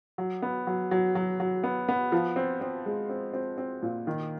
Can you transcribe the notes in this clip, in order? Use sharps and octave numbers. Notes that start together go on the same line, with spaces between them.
F#3
B3
F#3
F#3
F#3
F#3
B3
B3
F3
C4
C4
G#3
C4
C4
C4
A#2
D#3